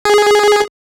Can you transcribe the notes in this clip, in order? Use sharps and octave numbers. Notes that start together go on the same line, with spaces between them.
G#4